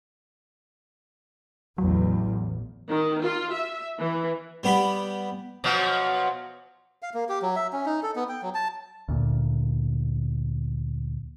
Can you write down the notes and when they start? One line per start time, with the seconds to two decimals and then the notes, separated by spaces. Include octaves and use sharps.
1.78 A1 E2 F#3
2.89 D#3
3.22 F4
3.52 E5
3.99 E3
4.63 G3 B3 G4 B5
5.64 B2 F3 F#3
7.02 F5
7.14 A#3
7.29 G4
7.42 F#3
7.56 E5
7.73 C#4
7.86 D#4
8.03 A4
8.16 B3
8.29 G5
8.42 F#3
8.54 A5
9.08 D2 A#2